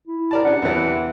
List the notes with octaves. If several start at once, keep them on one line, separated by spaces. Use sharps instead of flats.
E4
A#4 D5 A5
C#3 D4 F#5
E2 C3 E3